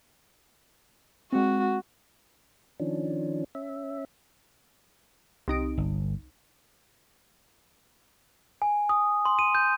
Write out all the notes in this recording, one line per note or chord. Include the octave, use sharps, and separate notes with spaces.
G#3 C4 F#4
D#3 F3 C#4 D4
C#4 E5
C2 D#4 D7
G1
G#5
D#6
C6
D#7
G6